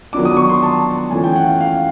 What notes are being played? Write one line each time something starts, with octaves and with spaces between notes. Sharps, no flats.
D#3 F#3 B3 D4 F4 D6
D#6
C#6
C6
A5
E3 A3 C#4 F4 G#5
G5
F#5
F5
F5